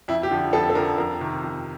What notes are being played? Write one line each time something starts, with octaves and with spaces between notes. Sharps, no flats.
F2 E4
G4
D3 F3
F2 A4
A4
D3 F3 A#4
F2 A#4
C3 D#3
F2